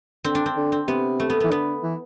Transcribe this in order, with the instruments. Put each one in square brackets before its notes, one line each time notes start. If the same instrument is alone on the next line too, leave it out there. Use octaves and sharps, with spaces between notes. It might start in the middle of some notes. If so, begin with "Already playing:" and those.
[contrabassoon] D3 [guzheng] C4
[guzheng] D4
C4
[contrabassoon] D3
[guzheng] C4
[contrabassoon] C3 [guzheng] B3
[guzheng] A3
B3
[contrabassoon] E3 [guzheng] B3
[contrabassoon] D3 [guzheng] B3
[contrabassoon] E3